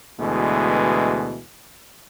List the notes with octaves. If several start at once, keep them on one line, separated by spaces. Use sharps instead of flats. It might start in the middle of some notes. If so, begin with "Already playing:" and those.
D2 B2 E3 G#3